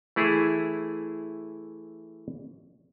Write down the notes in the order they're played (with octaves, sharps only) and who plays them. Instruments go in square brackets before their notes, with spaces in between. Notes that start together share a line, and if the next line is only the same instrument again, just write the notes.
[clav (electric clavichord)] E3 A3 E4 G#4